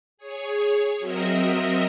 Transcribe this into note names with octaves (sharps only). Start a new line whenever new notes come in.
G#4 C#5
F#3 C4 F#4 A#4 D#5 E5